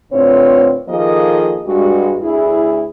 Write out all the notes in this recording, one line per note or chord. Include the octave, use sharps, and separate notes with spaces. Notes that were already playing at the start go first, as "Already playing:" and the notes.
A2 D3 C4 F4 B4 C#5
D#3 F3 A#3 G#4 A4 D#5
G2 G#3 F#4
D2 E4 G#4